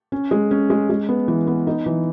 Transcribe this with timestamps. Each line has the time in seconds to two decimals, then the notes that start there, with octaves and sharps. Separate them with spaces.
0.12 C#4
0.31 G#3
0.51 C#4
0.70 G#3
0.90 G#3
1.09 B3
1.28 E3
1.47 B3
1.67 D#4
1.86 E3